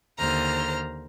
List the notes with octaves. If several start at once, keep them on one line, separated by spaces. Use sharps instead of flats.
D#2 D3 C5 A#5 F6